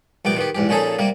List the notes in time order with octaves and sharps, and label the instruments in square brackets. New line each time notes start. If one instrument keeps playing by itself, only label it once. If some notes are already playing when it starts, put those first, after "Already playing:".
[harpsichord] A#1 C3 B3 G5 D6
D#3 B3 G4
E2 G#2 G4
A#2 F3 C#4 D#4 G#4 A4
C3 G3 A#3